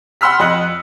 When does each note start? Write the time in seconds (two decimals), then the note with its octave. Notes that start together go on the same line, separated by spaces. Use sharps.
0.21 F#5 B5 C6 E6 F6 B6
0.39 F2 D#5 F#6 C#7 F#7